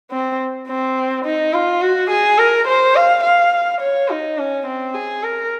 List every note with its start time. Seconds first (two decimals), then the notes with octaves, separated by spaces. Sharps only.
0.11 C4
0.68 C4
1.25 D#4
1.53 F4
1.81 F#4
2.10 G#4
2.38 A#4
2.67 C5
2.95 F5
3.23 F5
3.81 C#5
4.09 D#4
4.38 C#4
4.66 C4
4.94 G#4
5.23 A#4